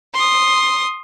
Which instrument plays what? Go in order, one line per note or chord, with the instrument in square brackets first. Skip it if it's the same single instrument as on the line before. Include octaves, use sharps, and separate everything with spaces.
[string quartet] C6 D#6